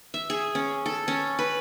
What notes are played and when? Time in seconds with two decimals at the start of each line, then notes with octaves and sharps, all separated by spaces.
0.14 E5
0.30 G#4
0.55 C#4
0.86 A4
1.08 C#4
1.39 B4